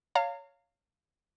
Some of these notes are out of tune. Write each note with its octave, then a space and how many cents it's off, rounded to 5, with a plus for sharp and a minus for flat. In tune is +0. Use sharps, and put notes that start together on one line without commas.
C#5 +15 F5 +0 A#5 -35